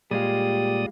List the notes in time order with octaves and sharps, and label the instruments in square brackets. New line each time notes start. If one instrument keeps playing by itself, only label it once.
[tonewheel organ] A#2 D5 D#6 [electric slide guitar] G3 G#3 F4 [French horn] G4